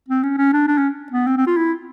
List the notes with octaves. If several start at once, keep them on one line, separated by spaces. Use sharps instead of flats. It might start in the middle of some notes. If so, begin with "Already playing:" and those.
C4
C#4
C#4
D4
D4
C#4
B3
C4
C4
F4
E4